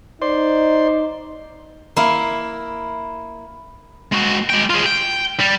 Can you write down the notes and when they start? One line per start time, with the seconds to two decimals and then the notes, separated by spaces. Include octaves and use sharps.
0.22 D#4 C5 D5 C6
1.96 A#3 E4
4.12 G#3 F#4
4.50 G#3 G5
4.70 F4 G#4
4.86 G5
5.40 G3